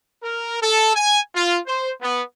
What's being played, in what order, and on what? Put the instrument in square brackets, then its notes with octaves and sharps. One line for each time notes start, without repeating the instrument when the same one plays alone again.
[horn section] A#4
A4
G#5
F4
C5
B3